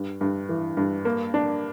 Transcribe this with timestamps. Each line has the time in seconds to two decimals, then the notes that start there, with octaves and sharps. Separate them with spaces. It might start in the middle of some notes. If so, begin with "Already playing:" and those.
Already playing: G2
0.21 G2
0.49 E3
0.77 G2
1.05 A#3
1.34 D4